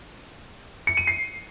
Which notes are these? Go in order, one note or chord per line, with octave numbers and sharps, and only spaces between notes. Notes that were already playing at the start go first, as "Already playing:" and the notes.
C#7
D#7
C7